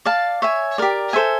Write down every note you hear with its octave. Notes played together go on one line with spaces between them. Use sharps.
D5 F5 A5
C#5 E5 G#5
G4 A#4 D5
A4 C5 E5 G#5